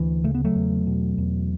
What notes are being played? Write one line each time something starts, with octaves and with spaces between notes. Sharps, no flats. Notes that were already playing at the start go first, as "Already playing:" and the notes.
Already playing: D2 E3
C#3 A3
B3
F#3 A3
E2
B2
E2